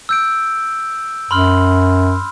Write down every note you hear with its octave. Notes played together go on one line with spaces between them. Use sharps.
E6 G6 D7
F#2 B5 C6 F6